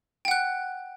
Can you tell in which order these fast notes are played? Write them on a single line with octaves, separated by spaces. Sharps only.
G5 F#5 F#6